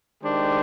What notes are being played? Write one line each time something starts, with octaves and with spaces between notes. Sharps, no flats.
D#3 G#3 D4 G4 C5